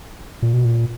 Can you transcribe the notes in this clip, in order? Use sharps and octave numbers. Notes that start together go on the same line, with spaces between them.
A#2
B2
A#2